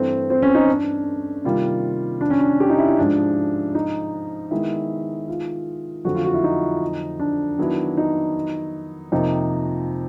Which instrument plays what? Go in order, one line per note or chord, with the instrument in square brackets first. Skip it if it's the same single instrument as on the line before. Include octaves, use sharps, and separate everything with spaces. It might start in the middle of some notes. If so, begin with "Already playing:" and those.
Already playing: [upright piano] G2 E3 A3 [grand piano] C4
[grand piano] C4
C#4
D#4
D4
[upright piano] C3 D#3 G3 A#3 [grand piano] F4
[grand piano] D4
C#4
D4
G4
D#4
E4
E4
[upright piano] G#2 F3 G#3 [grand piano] D4
[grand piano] D#4
[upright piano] D#3 G#3 B3 [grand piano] E4
[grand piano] F4
[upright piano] F2 D3 F#3 A3 [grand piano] F#4
[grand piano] F4
F#4
E4
D#4
D4
[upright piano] D#3 F#3 B3 E4
[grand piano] D#4
[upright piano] F2 C3 F3 A#3 [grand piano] D#4